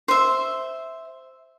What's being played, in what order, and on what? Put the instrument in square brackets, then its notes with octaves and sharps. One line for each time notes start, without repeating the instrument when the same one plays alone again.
[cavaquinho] C5 E5